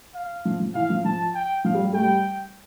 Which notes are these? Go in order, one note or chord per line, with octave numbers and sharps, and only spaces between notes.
F5
F3
F3
E3 F5
F3
F3 A5
G5
F3 F5
G3
G3
A3 G5
G3